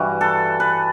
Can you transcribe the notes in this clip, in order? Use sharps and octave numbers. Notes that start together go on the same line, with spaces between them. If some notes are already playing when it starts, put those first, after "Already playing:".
Already playing: G2 E3 G3 F#4
A4
B4